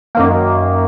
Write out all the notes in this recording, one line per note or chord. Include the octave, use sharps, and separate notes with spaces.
F#2 D#3 A#3